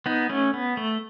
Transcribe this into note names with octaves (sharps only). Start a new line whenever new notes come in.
B3 D#4
A3 C#4
B3
A3